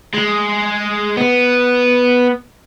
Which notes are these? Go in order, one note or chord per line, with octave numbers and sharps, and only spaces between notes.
G#3
B3